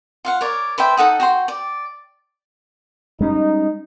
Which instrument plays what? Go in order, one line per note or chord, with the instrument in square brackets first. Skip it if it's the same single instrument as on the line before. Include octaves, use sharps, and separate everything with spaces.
[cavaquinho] F4 F5 F#5
A#4 C#5 D5
B4 C5 E5 G5
D#4 A4 F#5 D#6
F#4 G5 C6
D5
[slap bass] G3 G#3 C#4 [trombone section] D#4